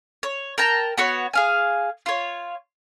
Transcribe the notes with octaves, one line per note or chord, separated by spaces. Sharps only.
C#5
A#4 G5 A5 A#5
B3 F#4 C#5
G#4 F5 G#5
F4 C#5